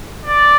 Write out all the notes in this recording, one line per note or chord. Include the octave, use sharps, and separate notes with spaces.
D5